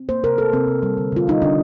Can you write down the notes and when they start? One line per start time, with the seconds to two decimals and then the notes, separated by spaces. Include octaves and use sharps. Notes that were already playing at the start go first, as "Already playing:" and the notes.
Already playing: C4
0.09 A#3 C5
0.24 C3 A#4
0.38 C3 A4
0.53 C3 C4
0.68 C3
0.83 G3
0.98 D3
1.12 D3 F4
1.28 G3 D#4
1.42 D3 D4